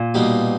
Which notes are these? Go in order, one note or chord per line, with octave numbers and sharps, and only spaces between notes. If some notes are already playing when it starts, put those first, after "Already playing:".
Already playing: A#2
B2 G3 A#3 D#4